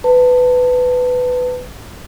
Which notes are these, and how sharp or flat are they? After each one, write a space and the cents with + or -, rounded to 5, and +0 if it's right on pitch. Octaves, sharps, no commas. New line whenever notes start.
B4 +15 A5 +20